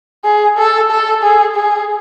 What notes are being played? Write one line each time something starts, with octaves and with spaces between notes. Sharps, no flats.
G#4
A4
A4
G#4
G#4